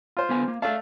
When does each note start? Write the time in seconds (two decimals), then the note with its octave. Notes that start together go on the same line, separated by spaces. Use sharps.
0.17 F4 C5
0.29 D3 B3 G#5
0.48 A#3
0.62 A3 D5 F5 A5